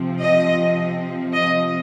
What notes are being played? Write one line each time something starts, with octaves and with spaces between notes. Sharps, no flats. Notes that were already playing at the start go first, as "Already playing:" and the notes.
Already playing: C3 F3 C4
D#5
D#5